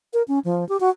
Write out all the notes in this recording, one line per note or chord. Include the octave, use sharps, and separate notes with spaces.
A#4
C#4
F3
G4
F#4